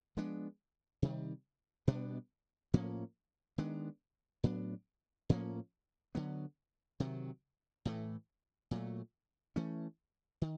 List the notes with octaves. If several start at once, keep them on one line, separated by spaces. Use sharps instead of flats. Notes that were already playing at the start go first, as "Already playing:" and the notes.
F3 G#3 B3 D4
C3 D#3 G3
B2 G3 B3 D4
A2 F3 A#3 C#4
D#3 G#3 B3 D4
A2 F#3 B3 D4
A2 F3 A#3 C#4
D3 F#3 B3
C3 D#3 F#3
A2 E3 A3
A#2 F#3 A3
E3 A3 C#4
D#3